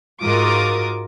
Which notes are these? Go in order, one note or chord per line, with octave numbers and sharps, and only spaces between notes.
G#2 F4 F#4 A#4 D6 D#6